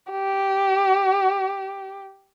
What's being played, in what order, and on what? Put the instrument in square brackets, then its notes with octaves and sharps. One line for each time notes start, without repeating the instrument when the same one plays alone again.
[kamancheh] G4